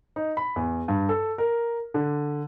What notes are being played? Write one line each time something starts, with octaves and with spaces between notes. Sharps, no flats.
D#4
B5
E2
G2
A4
A#4
D3